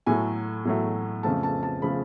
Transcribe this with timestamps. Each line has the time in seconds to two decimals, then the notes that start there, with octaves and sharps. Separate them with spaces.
0.06 A2 F#3 A3 G#5
0.65 A2 F#3 A3
1.23 F2 C#3 F3 A3 A5
1.43 A5
1.63 A5
1.82 C#3 F3 A3 B5